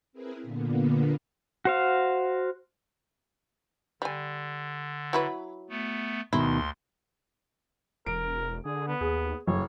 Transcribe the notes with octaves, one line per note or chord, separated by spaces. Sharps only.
C4 E4 G#4 A#4 B4
A#2 D3 A#3 B3
F#4 C5 F5
D3 G3 G#5
F#3 E4 B4
A3 B3
D2 B2 D#3 E4 C6
E1 A#4 D7
D3 G#4
B3
D#2 G#4
F#1 F#2 C#5